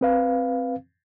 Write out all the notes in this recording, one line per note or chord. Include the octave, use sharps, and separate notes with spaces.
C4 B4 F5